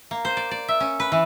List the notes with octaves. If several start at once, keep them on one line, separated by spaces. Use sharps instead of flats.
A#3
C5
D5
D5
E5
C#4
B4
E3